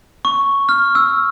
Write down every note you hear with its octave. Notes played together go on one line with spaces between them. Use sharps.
C#6
F6
E6